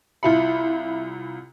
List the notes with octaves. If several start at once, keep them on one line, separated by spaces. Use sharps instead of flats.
C2 E4 F4 E5 B5 C#7